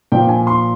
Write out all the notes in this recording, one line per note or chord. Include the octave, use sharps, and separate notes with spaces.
A#2 F3 G5
G#5
C6